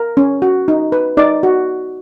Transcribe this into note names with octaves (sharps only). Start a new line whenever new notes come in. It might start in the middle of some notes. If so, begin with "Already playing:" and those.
Already playing: A#4
C#4
F#4
D#4
B4
D#4 D5
F#4